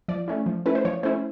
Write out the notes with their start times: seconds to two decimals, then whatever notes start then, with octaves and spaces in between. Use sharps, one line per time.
0.08 F3 D5
0.28 A3 C#4 E4
0.46 F3
0.66 A3 C#4 E4 B4
0.75 C5
0.85 F3 C#5
1.03 A3 C#4 E4 C5